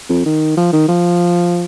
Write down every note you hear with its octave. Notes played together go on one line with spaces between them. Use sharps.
F2
D#3
F3
D#3
F3